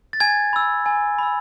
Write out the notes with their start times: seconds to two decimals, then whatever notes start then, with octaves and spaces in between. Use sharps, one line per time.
0.13 A6
0.20 G#5 G#6
0.53 B5 E6
0.86 G#5
1.18 B5 E6